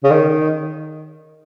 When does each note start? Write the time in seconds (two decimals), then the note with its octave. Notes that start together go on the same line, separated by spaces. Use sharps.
0.04 C#3
0.11 D#3